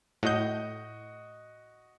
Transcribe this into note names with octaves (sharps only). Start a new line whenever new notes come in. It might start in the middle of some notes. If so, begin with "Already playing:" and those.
A2 F#4 D#5 G6